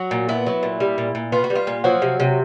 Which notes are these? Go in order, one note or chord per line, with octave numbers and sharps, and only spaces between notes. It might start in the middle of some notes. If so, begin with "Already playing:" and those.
Already playing: F#3 F#4
A#2
B3 E4
F#3
A#2
G3
A#2
A#2
B3 F4
F#4
G3
F4
A#2
F3 F#3 F#4
C3
C3